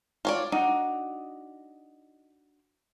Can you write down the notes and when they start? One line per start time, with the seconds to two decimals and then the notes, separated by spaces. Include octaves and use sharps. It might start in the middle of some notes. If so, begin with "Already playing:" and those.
0.25 F4 C#5 D5
0.52 D4 D#4 F#4